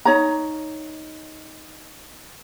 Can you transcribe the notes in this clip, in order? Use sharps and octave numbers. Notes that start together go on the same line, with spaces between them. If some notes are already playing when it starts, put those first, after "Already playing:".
D#4 C#5 A#5